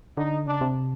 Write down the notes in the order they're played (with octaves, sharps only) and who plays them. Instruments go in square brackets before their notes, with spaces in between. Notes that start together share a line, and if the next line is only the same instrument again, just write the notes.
[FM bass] D3 [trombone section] D#4
[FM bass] C#3 [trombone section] D4
[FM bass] C3